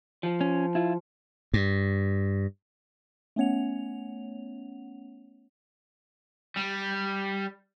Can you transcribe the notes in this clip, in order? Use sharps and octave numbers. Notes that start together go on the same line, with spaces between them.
F3
C#4
E4 F4
G2
A3 B3 C#4 C#5 F#5 F7
G3